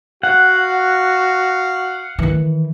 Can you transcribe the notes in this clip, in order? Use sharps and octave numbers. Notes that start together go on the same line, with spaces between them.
F#4 F5 F#5
D#3 E3